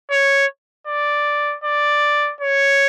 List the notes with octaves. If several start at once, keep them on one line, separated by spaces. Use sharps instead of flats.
C#5
D5
D5
C#5